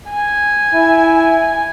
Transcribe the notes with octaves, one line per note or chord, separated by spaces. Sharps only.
G#5
E4